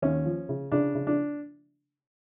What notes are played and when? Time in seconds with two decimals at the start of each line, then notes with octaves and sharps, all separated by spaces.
0.02 D#2 C#4
0.26 F3
0.49 C#3
0.72 C#3 D4
0.95 C#3
1.07 D4